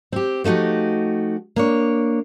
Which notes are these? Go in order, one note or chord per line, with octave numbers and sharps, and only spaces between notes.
C4 G4
F3 A3 D#4 F#4 G4
A#3 D4 C#5